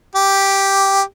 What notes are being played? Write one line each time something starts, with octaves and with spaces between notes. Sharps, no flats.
G4